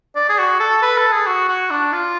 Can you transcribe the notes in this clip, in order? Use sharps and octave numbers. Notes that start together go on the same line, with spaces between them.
D5
G#4
F#4
A4
B4
A4
G#4
F#4
F#4
D4
F4